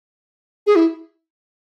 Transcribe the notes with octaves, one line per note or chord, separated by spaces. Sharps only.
G#4
E4